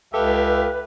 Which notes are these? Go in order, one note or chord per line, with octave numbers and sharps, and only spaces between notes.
C#2 G4 A4 B4 E5 F5